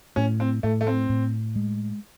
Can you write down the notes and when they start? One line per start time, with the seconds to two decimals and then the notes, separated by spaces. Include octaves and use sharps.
0.16 A2 C#4
0.40 C4
0.63 A2 A3
0.81 A3
0.87 C4
1.09 A2
1.56 G#3